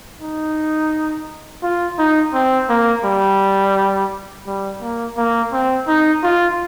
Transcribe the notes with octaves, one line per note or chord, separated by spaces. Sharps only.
D#4
F4
D#4
C4
A#3
G3
G3
A#3
A#3
C4
D#4
F4